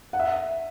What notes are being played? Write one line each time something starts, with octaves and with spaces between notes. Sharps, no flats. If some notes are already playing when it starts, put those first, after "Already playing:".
F#5
E5